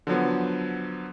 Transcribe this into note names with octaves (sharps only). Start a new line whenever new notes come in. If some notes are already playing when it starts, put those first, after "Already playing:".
D3 F3 F#3 B3